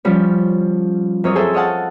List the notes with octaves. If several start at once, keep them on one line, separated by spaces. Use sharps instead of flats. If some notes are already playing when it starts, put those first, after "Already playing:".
F3 G3 C#4 C#5
F#2 C4 C#5 D#5
G#4 A4 C5 E5 G5
C#5 D#5 F5 F#5 A5